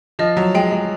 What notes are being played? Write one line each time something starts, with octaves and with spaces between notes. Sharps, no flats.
F3 D#5
F#3
G#3 G5
G#3